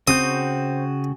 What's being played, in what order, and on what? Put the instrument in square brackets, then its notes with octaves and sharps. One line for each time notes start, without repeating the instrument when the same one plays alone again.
[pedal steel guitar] C#3 F#4 G6 [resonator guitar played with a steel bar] C4 [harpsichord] D#6